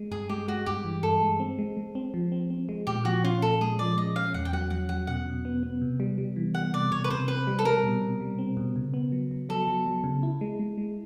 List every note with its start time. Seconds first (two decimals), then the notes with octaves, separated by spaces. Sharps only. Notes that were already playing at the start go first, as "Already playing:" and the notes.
Already playing: G#3
0.11 G2 G#4
0.29 G#3 G4
0.48 G#3 F#4
0.66 G2 G4
0.85 E3
1.03 G2 A4
1.22 G#3
1.40 C4
1.59 G#3
1.77 G#3
1.95 C4
2.14 F3
2.32 C4
2.50 C4
2.69 G#3
2.87 A#2 G4
3.05 F3 F#4
3.24 C#4 F4
3.42 A#2 A4
3.61 G#3 G#4
3.79 F3 D5
3.97 G#3 D#5
4.16 C#4 F5
4.34 E2 F#5
4.45 G5
4.53 F#3 F#5
4.70 F#3 F#5
4.89 F#3 F#5
5.07 B2 F#5
5.26 B2
5.45 B3
5.63 B3
5.81 C3
6.00 G3
6.18 G3
6.36 E3
6.54 G3 F#5
6.73 C3 D5
6.91 C3 C#5
7.04 B4
7.10 C3 C5
7.28 C4 B4
7.47 G3
7.59 A4
7.65 G3 A#4
7.84 B2
8.02 B2
8.20 G3
8.38 C4
8.57 B2
8.76 C#3
8.94 B3
9.12 F#3
9.31 F#3
9.49 F#3 A4
9.68 F#3
9.86 F#3
10.04 C#3
10.23 E4
10.41 G#3
10.59 G#3
10.78 G#3